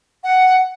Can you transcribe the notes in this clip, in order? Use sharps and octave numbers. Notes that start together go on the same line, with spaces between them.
F#5